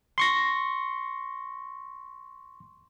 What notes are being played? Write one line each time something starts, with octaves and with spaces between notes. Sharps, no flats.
C6 C#6 A#6